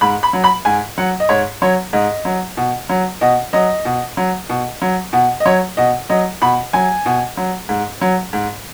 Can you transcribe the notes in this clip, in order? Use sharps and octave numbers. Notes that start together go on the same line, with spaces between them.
G#2 B5
B5
F#3
B5
G#2 G#5
F#3 F#5
D#5
G#2 C#5
F#3 C#5
G#2 D#5
F#3
B2
F#3
B2 D#5
F#3 D#5
B2
F#3
B2
F#3
B2
D#5
F#3 C#5
B2 D#5
F#3 D#5
B2 B5
F#3 G#5
B2
F#3
G#2
F#3
G#2